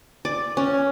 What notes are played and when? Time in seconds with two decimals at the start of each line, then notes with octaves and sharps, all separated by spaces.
0.25 D5
0.57 C#4